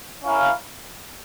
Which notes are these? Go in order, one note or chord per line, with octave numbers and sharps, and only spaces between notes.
C#4 E4 A#4 F5